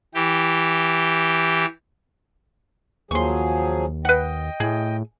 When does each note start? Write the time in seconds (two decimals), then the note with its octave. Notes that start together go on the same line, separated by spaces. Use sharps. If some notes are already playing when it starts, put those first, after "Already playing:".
0.14 E3 G4
3.11 D#2 F3 F#3 G#4 C6 C#6
4.05 B4 D#5 F#5 G5
4.60 A2 G#4